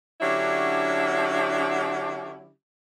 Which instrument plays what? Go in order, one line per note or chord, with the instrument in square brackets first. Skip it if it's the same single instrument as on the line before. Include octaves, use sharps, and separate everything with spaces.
[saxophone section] D3 F#3 C#4 D4 E4 G4